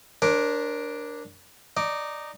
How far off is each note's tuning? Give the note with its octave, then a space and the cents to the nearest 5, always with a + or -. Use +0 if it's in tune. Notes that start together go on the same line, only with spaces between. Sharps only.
D4 +0 A#4 +15 C#5 -35
D#4 -10 D5 +0